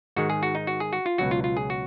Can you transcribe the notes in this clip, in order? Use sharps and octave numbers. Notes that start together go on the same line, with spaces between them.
G#2 D#3 G#3 F#4
G#4
F#4
D#4
F#4
G#4
F#4
F4
C#2 B2 F#3 F#4
F4
F4
G#4
F#4